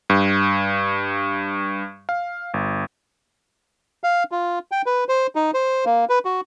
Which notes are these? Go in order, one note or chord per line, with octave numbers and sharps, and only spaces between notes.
G2
F5
G1
F5
F4
G5
B4
C5
D#4
C5
A#3
B4
F#4